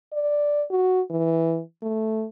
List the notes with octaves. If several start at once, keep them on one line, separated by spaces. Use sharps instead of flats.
D5
F#4
E3
A3